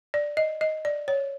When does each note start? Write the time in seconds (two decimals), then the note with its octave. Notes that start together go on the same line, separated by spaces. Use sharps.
0.14 D5
0.37 D#5
0.61 D#5
0.85 D5
1.08 C#5